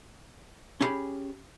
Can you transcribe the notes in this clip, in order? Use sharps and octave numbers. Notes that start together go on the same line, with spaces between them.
C#4 E4 G4 G#4 B5